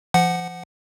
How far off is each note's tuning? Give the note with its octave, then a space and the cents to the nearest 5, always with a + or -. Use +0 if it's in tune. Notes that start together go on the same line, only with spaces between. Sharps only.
F3 -25 F#5 +0